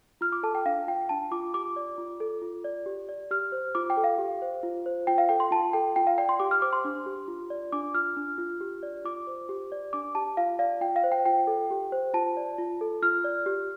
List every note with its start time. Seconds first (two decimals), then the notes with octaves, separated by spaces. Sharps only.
0.21 F4 F6
0.32 D6
0.43 A4 A5
0.55 G5
0.65 D4 F5
0.87 F4 G5
1.09 D4 A5
1.31 F4 D6
1.54 G4 D6
1.76 D5
1.98 F4
2.20 A4
2.42 F4
2.64 D5
2.86 G4
3.09 D5
3.31 G4 F6
3.52 C5
3.75 F4 D6
3.90 G5
3.97 A4
4.04 F5
4.18 G4
4.42 C5
4.63 F4
4.86 C5
5.07 F4 G5
5.18 F5
5.29 A4 G5
5.40 C6
5.51 F4 A5
5.73 A4 G5
5.96 F4 G5
6.07 F5
6.18 D5 G5
6.29 C6
6.40 G4 D6
6.51 F6
6.62 C5 D6
6.73 C6
6.85 D4
7.06 G4
7.28 F4
7.50 D5
7.72 D4 D6
7.94 F4 F6
8.17 D4
8.38 F4
8.61 G4
8.83 D5
9.04 F4 D6
9.27 C5
9.49 G4
9.72 D5
9.93 D4 D6
10.15 G4 A5
10.37 F4 F5
10.59 D5 F5
10.81 F4 G5
10.96 F5
11.04 C5
11.12 G5
11.25 F4 G5
11.47 A4
11.71 G4
11.92 C5
12.14 F4 A5
12.37 D5
12.58 F4
12.81 A4
13.02 F4 F6
13.24 D5
13.46 G4